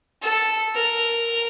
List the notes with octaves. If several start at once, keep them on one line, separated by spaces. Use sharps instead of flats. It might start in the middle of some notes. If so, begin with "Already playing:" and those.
A4
A#4